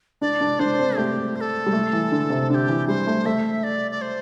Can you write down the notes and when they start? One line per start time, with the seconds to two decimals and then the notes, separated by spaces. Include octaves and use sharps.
0.22 D4 D5
0.41 D4
0.59 D4 C5
0.79 C4
0.97 A3 G4
1.36 C5
1.41 A4
1.66 G3
1.73 A3
1.93 E3
2.12 D3
2.30 C3
2.50 D3 G4 A4
2.69 E3
2.88 G3 C5
3.07 A3
3.26 A3 E5
3.64 D5
3.91 D5
4.02 C5